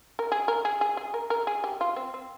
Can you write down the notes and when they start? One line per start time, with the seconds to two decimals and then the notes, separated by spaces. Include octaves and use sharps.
0.19 A#4
0.32 G#4
0.48 A#4
0.65 G#4
0.81 G#4
0.97 G#4
1.14 A#4
1.30 A#4
1.47 G#4
1.64 G4
1.81 F4
1.96 C4
2.14 C4